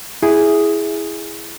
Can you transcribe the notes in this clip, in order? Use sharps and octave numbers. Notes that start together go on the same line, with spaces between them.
E4 G#4